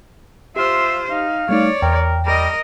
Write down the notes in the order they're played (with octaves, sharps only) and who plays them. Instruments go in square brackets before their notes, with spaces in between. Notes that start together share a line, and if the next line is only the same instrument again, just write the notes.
[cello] F4 C5 [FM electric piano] G4 F6 [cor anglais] E5
[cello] D#4 [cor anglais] F5
[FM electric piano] G3 A3 D#4 [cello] C#5 D5
[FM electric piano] E2 G5 [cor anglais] A#4
[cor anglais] G3 [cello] A#4 D#5